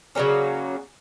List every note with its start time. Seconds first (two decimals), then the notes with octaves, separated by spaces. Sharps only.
0.15 C#3 F#3 A#3 C#4